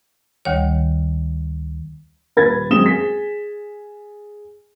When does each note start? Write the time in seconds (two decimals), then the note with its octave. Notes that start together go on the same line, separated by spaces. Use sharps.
0.45 D2 D#3 G3 C#5
2.37 D#1 B4 G#6 A6
2.70 F#2 G#3 C4 D#6 E7 G7
2.86 G#4 B6